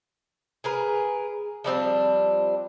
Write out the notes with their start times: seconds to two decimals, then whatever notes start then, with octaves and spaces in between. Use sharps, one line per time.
0.64 G#4 A#4 B4
1.64 F3 G3 C4 D4